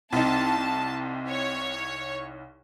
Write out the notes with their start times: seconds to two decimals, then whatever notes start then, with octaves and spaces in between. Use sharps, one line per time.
0.12 C2 C4 D#4 A5
0.58 C4
1.27 C#5